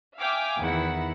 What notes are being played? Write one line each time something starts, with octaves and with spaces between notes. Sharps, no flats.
E5 F5 G5 G#5 D6 F6
E2 D#3 E4 F#5